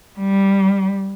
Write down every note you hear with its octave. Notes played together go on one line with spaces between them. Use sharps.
G3